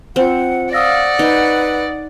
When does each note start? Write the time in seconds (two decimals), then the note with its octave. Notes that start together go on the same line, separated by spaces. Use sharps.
0.16 C4 F4 C5 F#5
0.73 D5 F5 F#5 D#6 E6 A#6
1.19 D#4 B4